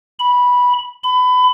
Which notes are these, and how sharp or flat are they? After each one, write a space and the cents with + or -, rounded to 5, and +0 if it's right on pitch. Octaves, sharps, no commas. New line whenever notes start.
B5 -10
B5 +25